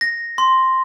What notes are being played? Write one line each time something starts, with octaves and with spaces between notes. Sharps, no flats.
A#6
C6